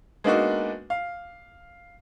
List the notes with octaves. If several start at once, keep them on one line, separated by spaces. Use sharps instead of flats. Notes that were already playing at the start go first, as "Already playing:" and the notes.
G#3 A#3 B3 D4 D#4 F#4
F5